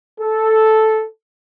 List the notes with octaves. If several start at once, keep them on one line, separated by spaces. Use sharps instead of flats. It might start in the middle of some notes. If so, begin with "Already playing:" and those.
A4